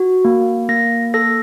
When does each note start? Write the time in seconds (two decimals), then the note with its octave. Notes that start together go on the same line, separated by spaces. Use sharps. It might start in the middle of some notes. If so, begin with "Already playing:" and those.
Already playing: F#4
0.25 A#3
0.69 A#3 A#6
1.14 A4 A#6